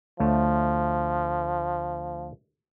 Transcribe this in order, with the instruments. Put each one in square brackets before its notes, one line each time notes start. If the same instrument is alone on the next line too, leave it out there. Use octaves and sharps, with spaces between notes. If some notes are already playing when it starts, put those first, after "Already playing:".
[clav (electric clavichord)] D2 A3 C#5 [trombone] F3